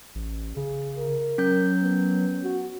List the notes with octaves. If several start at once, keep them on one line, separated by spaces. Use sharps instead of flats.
A1
C#3 G#4
A#4
F#3 C#4 G6
B3
F#4